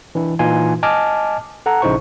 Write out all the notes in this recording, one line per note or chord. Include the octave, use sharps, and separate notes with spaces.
E3 D4 E4
A#2 E3 D#4 F4 G#5 C6
D#5 G#5 A5 D6 F6
A4 F#5 A#5
A#1 C#3 D#4 E4 C5 C#6